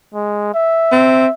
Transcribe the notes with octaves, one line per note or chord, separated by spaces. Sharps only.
G#3
E5
C4